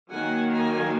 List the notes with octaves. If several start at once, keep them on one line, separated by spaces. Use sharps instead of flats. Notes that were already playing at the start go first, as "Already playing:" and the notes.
D#3 F#3 A#3 F#5 G#5
G#5 A#5